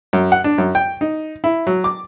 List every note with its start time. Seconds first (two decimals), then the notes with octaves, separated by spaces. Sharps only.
0.13 F#2
0.32 F#5
0.44 D4
0.58 F#2
0.75 G5
1.01 D#4
1.44 E4
1.67 F#3
1.84 D6